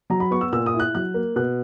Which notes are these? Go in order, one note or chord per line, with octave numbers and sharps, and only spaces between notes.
F#3 A#5
B5
B3 C#6
E6
A#2 E6
D#6
E4
F#6
F#3 F#6
A#3
B2 F#6